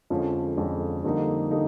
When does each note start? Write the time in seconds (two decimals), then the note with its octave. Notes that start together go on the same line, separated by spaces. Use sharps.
0.10 F2 D3 F3 G#3 C#4
0.57 F2 D3 F3 G#3 C#4
1.04 F2 D3 G3 A#3 D#4
1.51 D3 G3 A#3 D#4